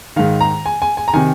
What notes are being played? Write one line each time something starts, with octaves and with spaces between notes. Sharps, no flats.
G#2 D#3 F5
A#5
G#5
G#5
G#5
A#5
C3 D#3 G#5